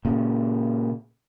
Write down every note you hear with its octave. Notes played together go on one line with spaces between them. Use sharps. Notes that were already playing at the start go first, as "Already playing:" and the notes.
A#2 C#3